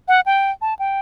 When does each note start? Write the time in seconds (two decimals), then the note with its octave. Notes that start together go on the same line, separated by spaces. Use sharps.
0.08 F#5
0.26 G5
0.62 A5
0.79 G5